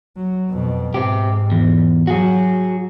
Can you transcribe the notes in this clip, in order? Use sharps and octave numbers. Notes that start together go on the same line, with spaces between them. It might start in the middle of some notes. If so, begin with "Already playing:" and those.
F#3
F2 B2
G#2 C4 G4
E2
F#3 F#4 G#4